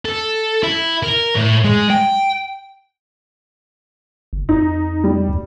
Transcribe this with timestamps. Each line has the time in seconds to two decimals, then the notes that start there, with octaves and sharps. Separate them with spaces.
0.05 A4
0.63 E4
1.03 A#4
1.36 A2
1.64 G#3
1.90 G5
4.33 F#1
4.49 F2 D#4
5.04 G3
5.29 D2